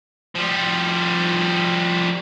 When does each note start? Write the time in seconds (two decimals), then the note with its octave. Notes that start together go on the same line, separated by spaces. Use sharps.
0.35 F3 G3